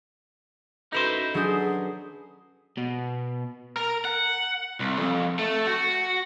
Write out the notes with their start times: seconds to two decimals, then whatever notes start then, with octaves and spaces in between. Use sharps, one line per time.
0.92 C#4 D#4 E4 F#4 A4 B4 C5 A#6
1.34 F#3 D4 G#4 D#6
2.78 B2
3.77 A#4
4.05 F#5
4.80 C2
4.98 F2
5.39 A3
5.67 F#4